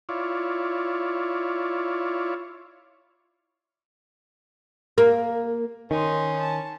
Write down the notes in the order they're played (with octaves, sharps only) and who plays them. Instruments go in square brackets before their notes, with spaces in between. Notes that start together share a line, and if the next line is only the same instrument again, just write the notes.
[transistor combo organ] E4 F4 C#5 D5
[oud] A#3
[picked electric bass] D#3 [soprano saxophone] C#4 [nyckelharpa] D#4 C6
[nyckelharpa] A5